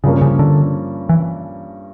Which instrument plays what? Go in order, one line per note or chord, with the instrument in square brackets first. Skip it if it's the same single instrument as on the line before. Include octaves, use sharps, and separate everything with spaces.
[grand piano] G2 F3 A#3 C#4 [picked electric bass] C#3
[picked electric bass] C#3
D3
E3